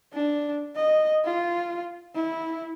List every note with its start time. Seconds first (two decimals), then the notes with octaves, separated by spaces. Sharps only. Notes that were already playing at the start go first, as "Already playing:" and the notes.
0.13 D4
0.76 D#5
1.25 F4
2.15 E4